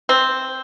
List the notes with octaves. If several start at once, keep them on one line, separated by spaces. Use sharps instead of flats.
C4